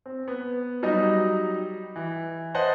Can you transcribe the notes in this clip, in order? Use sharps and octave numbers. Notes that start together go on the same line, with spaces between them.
C4
B3
F#3 G3 D#4 D#5
E3
B4 C5 D#5 F#5 A5